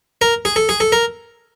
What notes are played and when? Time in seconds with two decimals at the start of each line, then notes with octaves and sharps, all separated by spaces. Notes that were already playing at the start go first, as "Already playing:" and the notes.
0.21 A#4
0.45 G#4
0.56 A4
0.69 G#4
0.80 A4
0.92 A#4